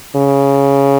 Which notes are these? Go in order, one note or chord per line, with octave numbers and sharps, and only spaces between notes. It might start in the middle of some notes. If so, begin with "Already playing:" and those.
C#3